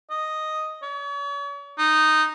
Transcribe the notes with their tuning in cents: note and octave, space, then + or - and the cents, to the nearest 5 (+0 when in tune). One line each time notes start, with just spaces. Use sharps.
D#5 +0
C#5 +40
D#4 -10